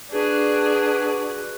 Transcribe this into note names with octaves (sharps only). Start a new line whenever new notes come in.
D4 F#4 G#4 B4